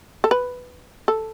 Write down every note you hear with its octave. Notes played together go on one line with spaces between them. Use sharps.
A4
B4
A4